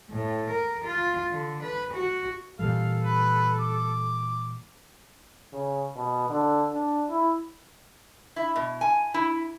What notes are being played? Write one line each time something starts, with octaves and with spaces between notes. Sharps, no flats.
A2
A#4
F4
D3
B4
F#4
A#2 E3 G3 A4 F5
B4
D6
C#3
B2
D3
D4
E4
E4
B2
G#5
E4